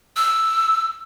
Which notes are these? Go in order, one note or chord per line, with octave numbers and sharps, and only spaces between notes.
E6